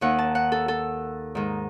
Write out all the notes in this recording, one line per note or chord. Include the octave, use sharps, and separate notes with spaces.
D#2 D#3 F#5
A5
F#5
A4
A4
G#2 D#3